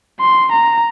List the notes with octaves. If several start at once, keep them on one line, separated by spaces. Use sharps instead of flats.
C6
A#5